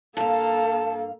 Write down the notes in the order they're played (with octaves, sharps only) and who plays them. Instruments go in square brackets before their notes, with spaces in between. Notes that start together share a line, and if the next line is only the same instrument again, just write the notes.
[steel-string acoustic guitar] G2 F5 [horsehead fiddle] A#3 A4 [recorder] A5